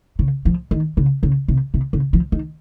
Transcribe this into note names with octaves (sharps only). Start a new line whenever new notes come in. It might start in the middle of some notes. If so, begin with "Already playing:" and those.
C#3
F3
D#3
C#3
C#3
C3
C3
C#3
F3
D#3